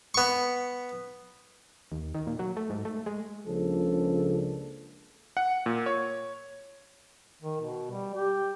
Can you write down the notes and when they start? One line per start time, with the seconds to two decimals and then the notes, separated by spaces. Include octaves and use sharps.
0.14 B3 C#6
1.92 D#2
2.15 D#3
2.27 A#2
2.39 F#3
2.57 A3
2.70 G#2
2.85 A3
3.06 G#3
3.48 C#2 C#3 F3 A#3 D4 A4
5.37 F#5
5.66 A#2
5.86 C#5
7.42 D#3
7.60 B2
7.91 G3
8.14 G4